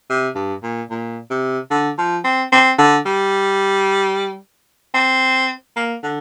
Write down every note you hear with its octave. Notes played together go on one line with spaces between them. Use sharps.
C3
G2
A#2
A#2
C3
D3
F3
C4
C4
D3
G3
C4
A#3
D3